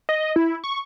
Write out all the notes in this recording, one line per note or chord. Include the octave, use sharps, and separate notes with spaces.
D#5
E4
C#6